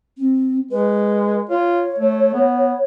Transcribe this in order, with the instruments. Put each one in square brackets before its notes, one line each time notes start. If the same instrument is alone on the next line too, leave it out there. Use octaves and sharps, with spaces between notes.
[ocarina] C4
[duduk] G#3 [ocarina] B4
[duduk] F4 [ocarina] C#5
[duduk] A3
B3